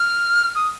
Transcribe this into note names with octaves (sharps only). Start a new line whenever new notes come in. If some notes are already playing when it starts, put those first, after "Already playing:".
Already playing: F6
D#6